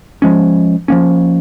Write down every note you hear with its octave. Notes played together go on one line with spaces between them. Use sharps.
F3 G#3 C#4
F3 A#3 C#4